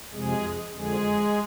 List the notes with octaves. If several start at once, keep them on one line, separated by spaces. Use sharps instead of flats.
F2 C3 F3 G#3 G#4
F2 D3 F3 G#3 G#4